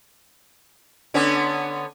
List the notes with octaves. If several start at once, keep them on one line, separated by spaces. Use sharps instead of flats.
D3 B3 C#4